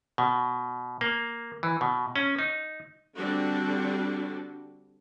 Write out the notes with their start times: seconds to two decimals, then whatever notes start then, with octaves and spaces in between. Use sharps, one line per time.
0.18 B2
1.01 A#3
1.63 E3
1.81 B2
2.16 C#4
2.39 D#4
3.16 D3 G3 C4 D4 F#4